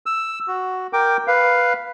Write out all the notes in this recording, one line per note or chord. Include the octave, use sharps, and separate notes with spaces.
E6
F#4
A#4 G5 D6
B4 F5